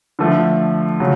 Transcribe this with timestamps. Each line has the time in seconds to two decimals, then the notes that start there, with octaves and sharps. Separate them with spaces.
0.19 D3 F3 A3
1.00 C#3 F#3